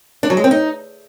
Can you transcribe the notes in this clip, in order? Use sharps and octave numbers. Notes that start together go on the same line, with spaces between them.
D4
F#3
G#3
C4
D#4